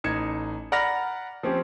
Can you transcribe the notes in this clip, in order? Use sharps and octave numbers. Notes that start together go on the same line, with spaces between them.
A1 D#4 G#6 C#7 E7
D5 F#5 A#5 B5 F6 A#6
F3 C4 C#4 G4